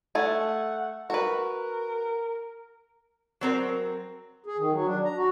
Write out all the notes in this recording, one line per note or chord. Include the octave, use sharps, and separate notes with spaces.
A3 F#5 G#5
F#4 A#4 B4
F#3 C4 A#4
G#4
D#3
F#3
D4
A#5
F#4